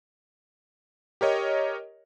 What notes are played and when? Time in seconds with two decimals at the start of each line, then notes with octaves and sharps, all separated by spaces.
1.21 G4 A#4 C#5 D#5